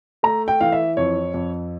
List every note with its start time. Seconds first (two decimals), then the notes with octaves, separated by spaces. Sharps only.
0.23 A3 A#5
0.48 G5
0.61 E3 F5
0.72 E5
0.97 F2 C#5
1.34 F2